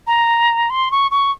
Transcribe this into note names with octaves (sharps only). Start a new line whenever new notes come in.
A#5
C6
C#6
C#6